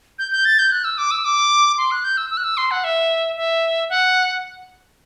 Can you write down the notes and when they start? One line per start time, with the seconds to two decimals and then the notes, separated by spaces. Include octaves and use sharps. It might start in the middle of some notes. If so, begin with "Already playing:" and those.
0.19 G6
0.32 G6
0.45 A6
0.59 G6
0.72 F#6
0.84 E6
0.98 D6
1.11 E6
1.25 D6
1.78 C6
1.91 F#6
2.04 G6
2.17 E6
2.30 E6
2.37 F#6
2.44 E6
2.57 C6
2.71 F#5
2.84 E5
3.37 E5
3.89 F#5